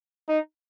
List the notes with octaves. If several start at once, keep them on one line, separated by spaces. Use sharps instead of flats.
D#4